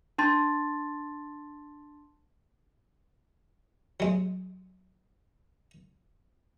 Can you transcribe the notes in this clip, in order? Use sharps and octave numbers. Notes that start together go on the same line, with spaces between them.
D4 A5 C6 A6
F#3 G#3